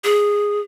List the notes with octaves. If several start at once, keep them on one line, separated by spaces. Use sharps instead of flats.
G#4